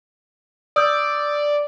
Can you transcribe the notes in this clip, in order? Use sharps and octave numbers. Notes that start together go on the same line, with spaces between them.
D5 D#6 E6 G6